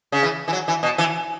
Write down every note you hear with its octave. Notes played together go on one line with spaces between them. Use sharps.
C#3
E3
E3
F#3
E3
B2
E3